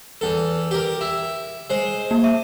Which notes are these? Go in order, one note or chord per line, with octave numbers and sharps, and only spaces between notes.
E2 A4
G4 A#4
E4
G#3 C5
A#3
E5